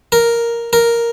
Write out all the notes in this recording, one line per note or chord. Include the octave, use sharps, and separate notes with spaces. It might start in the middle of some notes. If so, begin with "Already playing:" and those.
A#4
A#4